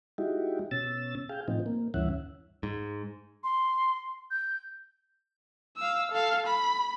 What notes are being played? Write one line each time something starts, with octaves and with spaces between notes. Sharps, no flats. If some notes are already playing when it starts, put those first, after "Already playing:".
G#3 D#4 E4 F#4 G4
B2 C#4 E6 A6
G#4 F5 G5
A2 F3 C4 D#4
A#3
D2 G2 E3 C#4 E5 F#5
G#2
C6
G6
F5 E6
A4 F5
B5